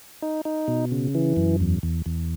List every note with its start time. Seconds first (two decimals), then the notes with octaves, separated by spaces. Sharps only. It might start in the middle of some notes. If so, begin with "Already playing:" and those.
0.22 D#4
0.45 D#4
0.68 B2
0.92 C#3
1.15 E3
1.36 F#2
1.61 E2
1.83 E2
2.06 E2